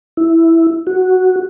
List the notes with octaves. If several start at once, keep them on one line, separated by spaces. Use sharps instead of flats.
E4
F#4